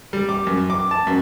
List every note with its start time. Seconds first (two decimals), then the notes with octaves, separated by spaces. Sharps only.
0.13 G3
0.29 D6
0.47 F#2
0.70 D6
0.91 A5
1.07 F#2